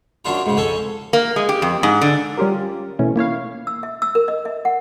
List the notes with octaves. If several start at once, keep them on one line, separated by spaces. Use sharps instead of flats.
F#2 F#3 D4 F4 A#5
G#2 C#3
F2 C#4 A4 G#5
A#3
G#3
G4
F2
G#2
D3
G3 C#4 F4 G4 A#4
B2 E3 A3 C#4
A#3 E4 C#5 F5
E6
E5
E6
A#4
D#5
E5
F#5